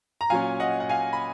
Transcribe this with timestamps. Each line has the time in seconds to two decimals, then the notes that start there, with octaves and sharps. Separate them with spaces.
0.21 A#5
0.30 A#2 F#3 C#4 F5 G#5
0.60 D#5 F#5
0.80 F#5
0.89 F5 G#5
1.13 B5